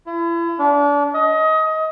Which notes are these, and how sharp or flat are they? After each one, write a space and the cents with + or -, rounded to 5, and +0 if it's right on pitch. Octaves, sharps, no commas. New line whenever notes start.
E4 +40
D4 -30
D#5 +25